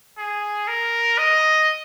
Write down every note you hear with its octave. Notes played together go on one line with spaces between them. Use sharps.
G#4
A#4
D#5